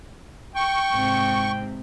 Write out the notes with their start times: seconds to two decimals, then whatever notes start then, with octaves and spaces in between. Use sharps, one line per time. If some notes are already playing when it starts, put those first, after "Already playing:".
0.56 G5 C#6
0.92 G#2 C3 C4